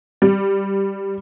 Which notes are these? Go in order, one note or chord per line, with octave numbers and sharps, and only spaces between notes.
G3